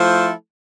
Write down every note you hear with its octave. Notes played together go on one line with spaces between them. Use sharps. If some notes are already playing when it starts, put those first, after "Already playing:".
Already playing: F3 A3 E4 A4 C5